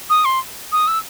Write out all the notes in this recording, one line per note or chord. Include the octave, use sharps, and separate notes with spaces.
D#6
C6
D#6
E6